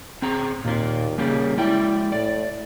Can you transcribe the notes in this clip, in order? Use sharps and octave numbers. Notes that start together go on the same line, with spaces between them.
C4 G#4 A#5
D#2 A#2 F4
C#3 G3 A#3 G4
G#3 E4 D5 G5
A2 D5